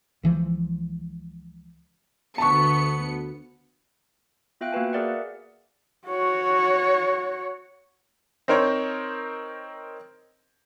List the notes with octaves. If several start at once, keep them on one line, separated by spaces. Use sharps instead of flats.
C#2 E3 F3
D2 B3 A5 C#6 C#7
B3 F4 E5 F5 G5 F#6
A#3 F#4 B4 G#5
G#4 A#4 D5 E5 F#5
F#4 C#5
C4 D#4 A#4 C5 C#5